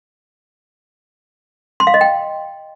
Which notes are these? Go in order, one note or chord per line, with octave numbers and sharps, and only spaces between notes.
C6
F5
D#5
G5